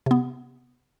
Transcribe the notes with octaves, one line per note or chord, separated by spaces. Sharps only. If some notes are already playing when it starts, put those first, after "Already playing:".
C3 B3